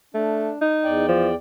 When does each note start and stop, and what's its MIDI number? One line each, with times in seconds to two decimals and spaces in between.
0.14 0.51 57
0.14 0.58 62
0.62 1.06 63
0.84 1.35 40
0.84 1.35 74
0.84 1.35 79
1.09 1.30 53